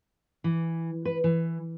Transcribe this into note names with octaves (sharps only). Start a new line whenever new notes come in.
E3
B4
E3